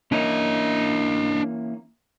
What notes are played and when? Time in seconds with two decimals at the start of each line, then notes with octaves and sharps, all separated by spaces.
0.12 E3 A#3 C#4 D4 D#5